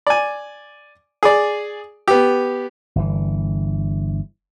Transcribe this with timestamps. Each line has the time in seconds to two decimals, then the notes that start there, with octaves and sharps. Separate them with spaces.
0.07 D5 G#5
1.23 G#4 D5
2.08 B3 G4
2.96 G1 E3